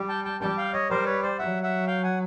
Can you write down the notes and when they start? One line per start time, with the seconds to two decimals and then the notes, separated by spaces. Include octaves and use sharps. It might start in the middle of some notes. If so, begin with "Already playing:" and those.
Already playing: G3
0.09 G5 A5
0.25 G5 A5
0.40 G3 G5 A5
0.57 F5 G5
0.73 C#5 D#5
0.89 G3 A#4 C5
1.06 B4 C#5
1.22 C5 D5
1.38 F#3 E5 F#5
1.63 E5 F#5
1.87 F5 G5
2.03 F#5 G#5